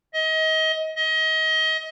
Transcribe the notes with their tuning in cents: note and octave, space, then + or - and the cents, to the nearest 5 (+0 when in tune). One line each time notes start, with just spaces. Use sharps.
D#5 +30
D#5 +30